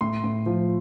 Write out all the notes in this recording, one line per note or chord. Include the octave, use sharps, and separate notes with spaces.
A2 C6
A2
F3